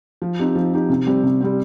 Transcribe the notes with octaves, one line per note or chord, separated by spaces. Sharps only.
F3
C4 D#4 G4
F3
C4 D#4 G4
C3
G3 C4 G4
C3
G3 C4 G4